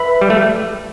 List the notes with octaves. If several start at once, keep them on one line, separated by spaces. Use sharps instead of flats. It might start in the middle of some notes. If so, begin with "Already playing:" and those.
Already playing: B4 E5 B5
G3
A3